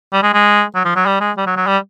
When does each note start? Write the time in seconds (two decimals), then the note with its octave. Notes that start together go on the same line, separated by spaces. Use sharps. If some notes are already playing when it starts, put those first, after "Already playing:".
0.13 G3
0.23 G#3
0.34 G#3
0.75 F#3
0.85 F3
0.96 F#3
1.06 G3
1.20 G#3
1.37 G3
1.46 F#3
1.57 F#3
1.67 G3